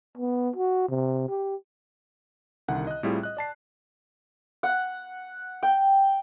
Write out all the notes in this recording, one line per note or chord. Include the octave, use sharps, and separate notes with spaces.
B3
F#4
C3
G4
C2 D3 D#3 E4 F#5
D#5 F#6
A2 G3 C4 E4 F4 G#4
D#5 F#6
D5 A5 C7
F#5
G5